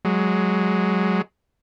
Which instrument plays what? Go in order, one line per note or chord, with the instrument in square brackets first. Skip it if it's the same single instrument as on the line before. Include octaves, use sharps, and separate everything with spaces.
[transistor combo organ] F#3 G#3